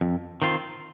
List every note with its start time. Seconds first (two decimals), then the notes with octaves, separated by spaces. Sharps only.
0.01 F2
0.42 D#3 C4 F4